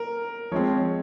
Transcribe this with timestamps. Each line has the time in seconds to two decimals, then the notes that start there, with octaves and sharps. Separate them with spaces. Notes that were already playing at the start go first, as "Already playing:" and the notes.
Already playing: A#4
0.52 F3 G#3 C4 C#5